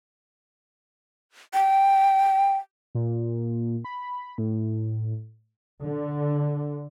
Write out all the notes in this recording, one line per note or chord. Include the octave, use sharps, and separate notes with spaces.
G5
A#2
B5
A2
D3